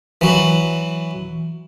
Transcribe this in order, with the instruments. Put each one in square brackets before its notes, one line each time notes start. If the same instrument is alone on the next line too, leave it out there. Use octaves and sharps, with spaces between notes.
[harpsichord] E3 F#3